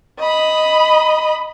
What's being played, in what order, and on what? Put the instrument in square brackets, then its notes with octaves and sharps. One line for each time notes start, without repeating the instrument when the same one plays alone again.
[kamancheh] D#5 B5